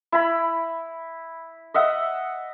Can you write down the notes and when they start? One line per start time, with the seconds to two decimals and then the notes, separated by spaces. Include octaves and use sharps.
0.12 E4 B5
1.74 D#5 E5 F#5